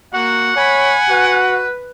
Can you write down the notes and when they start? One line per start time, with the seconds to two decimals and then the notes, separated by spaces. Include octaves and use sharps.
0.14 A#3 F#4 F#5
0.57 C#5 G#5 B5
1.09 F#4 B4